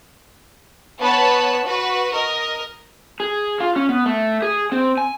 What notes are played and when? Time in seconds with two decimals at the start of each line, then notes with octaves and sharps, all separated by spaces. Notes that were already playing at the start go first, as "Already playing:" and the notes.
1.01 B3 B4 C#5 F#5 A5 B5
1.65 F#4 B4
2.13 A#4 D#5
3.20 G#4
3.60 F4
3.76 C#4
3.89 B3
4.06 A3
4.42 G#4
4.72 C4
4.98 G#5